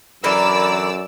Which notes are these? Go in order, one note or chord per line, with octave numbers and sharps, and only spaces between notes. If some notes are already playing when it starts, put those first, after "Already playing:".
F#2 D3 E3 A#4 D5 E6